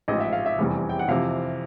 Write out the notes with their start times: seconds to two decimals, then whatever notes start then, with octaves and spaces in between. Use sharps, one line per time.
0.08 A1 G#2 F3 G#3 D#5
0.20 E5
0.33 F5
0.46 E5
0.58 F1 E2 C3 E3 G3
0.89 G5
0.99 F#5
1.08 F2 C3 E3 F5